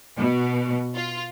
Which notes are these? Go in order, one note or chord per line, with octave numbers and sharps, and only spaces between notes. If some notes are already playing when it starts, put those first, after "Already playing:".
B2
F4